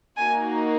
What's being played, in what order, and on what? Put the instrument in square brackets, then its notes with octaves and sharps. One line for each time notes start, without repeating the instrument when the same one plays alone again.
[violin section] A#3 D#4 F#4 G#5